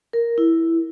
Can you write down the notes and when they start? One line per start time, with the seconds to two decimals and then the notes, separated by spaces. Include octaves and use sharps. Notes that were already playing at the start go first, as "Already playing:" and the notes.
0.13 A#4
0.38 E4